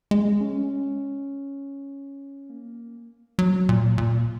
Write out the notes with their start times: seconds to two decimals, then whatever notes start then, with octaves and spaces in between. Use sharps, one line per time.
0.11 G#3
0.41 C#4
2.50 A#3
3.39 F#3
3.69 A#2
3.98 A#2